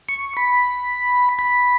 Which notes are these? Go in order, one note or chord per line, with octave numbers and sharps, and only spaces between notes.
C#6
B5
B5